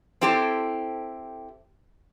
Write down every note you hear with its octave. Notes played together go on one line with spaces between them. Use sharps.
C4 E4 G4 A4 C5